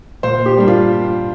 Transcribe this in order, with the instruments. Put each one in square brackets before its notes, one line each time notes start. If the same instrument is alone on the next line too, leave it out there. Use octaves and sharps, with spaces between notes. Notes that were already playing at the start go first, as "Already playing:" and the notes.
[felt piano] A#2 C5
G4
G3 A#3 D4
F4